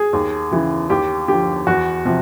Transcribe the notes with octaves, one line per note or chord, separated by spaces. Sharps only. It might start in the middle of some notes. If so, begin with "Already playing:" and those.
Already playing: G#4
D#2
C#3 E3
D#2 G4
D3 F3 G4
E2 F#4
C3 F3